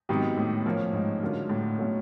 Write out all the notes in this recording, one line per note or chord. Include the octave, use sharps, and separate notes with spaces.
G#2 C3 D#3 F#3 B3 D#4
A2
F3 A#3 C#4
G#2
D3 F#3 A#3 C#4 F4
A2
B2 F#3 A3 C#4